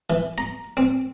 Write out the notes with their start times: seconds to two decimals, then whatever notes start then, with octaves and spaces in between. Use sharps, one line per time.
0.10 E3
0.38 A#5
0.77 C4